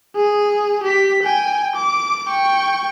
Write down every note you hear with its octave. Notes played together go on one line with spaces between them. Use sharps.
G#4
G4 B6
G5 G#5
D6
G5 C#6